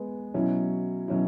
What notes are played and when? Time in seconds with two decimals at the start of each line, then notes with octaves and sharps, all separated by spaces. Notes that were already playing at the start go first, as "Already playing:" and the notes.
Already playing: G#3 B3
0.34 B2 F#3 C#4 E4
1.08 B2 F#3 C#4 E4